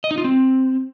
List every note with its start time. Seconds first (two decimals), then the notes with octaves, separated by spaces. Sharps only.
0.04 D#5
0.11 D#4
0.18 F4
0.24 C4